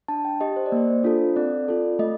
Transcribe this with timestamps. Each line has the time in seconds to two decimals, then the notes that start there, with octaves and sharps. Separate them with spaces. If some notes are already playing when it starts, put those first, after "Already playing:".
0.08 D4 A5
0.25 G5
0.41 G4 D#5
0.56 C5
0.66 D5
0.72 A#3 C5
1.04 D4 F4 A4
1.36 C4 D5
1.68 F4 A4
1.99 A3 D#5